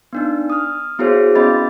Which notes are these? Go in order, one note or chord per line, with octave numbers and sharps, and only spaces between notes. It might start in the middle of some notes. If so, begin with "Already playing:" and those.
B3 D4 D#4
D#6 F6
B3 E4 F#4 G#4 C5 C#5
B3 C#4 D#5 B5 A6